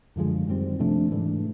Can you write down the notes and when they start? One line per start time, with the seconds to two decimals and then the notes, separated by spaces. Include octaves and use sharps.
0.16 F#2 D3 F3 G#3
0.48 F#2 D#3 G3 C4
0.79 C3 F3 A3 D4
1.11 G#2 E3 A3 D4